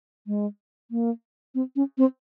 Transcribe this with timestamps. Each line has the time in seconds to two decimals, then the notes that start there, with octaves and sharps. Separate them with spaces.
0.27 G#3
0.91 A#3
1.55 C4
1.76 C#4
1.98 C4